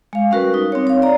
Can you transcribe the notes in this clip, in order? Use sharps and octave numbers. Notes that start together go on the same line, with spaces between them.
G#3 F5
G3 C#4 F#4 A#4 B4
D#4
C4 C#5
C#5 F5
D5 A#5